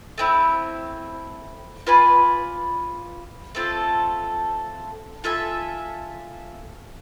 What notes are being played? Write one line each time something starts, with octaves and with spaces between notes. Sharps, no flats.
A3 C4 E4
F4 B4 D5 G#5
A3 C4 F4 A4
F4 A4 E5 G#5